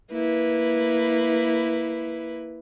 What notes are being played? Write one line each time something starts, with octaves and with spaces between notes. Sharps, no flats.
A#3 E4 B4